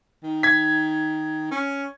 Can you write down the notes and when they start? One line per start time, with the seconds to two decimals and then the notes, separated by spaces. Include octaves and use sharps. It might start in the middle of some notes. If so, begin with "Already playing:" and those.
0.23 D#3
0.43 G#6 B6
1.51 C#4